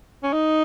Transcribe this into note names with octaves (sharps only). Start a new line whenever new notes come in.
C#4
D#4